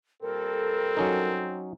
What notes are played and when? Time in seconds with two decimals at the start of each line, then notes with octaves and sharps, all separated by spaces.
0.23 A#2 G3 C4 A4 A#4
0.97 F#3 C#4 D#4